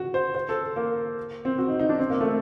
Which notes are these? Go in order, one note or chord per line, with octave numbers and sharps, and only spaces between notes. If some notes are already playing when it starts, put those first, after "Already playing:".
Already playing: F#4
C5
C5
A4
A#3
C4
F#4
D#4
D#4
D4
C4
A#3
A3